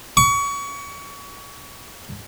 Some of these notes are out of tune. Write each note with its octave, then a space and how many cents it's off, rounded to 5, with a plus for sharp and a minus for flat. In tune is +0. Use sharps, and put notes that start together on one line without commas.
C#6 +30